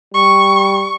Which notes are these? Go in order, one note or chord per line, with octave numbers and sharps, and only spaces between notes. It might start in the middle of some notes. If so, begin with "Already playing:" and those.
G3 C#6